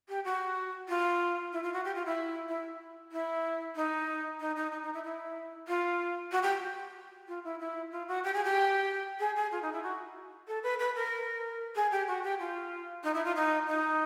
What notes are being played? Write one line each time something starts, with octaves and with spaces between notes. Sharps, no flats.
G4
F#4
F4
E4
F4
F#4
G4
F4
E4
E4
E4
D#4
D#4
D#4
D#4
D#4
E4
E4
F4
F#4
G4
F4
E4
E4
F4
F#4
G4
G#4
G4
G#4
G#4
F4
D#4
E4
F#4
A4
B4
B4
A#4
G#4
G4
F#4
G4
F4
D#4
E4
F4
D#4
D#4